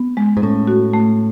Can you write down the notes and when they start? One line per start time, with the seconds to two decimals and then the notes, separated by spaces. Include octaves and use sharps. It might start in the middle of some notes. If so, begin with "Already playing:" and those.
Already playing: B3
0.17 G#3
0.37 G#2
0.42 A2 C#4
0.68 F#4
0.94 A3